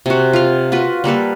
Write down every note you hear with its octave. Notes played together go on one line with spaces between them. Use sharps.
C3 F#4
F4 F5
F4 F#4 B4
G3 A#3 A4 B4